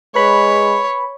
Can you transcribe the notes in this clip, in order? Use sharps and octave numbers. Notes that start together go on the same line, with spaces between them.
G#3 B4 C#5 B5